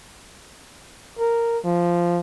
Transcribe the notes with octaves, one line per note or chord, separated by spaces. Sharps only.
A#4
F3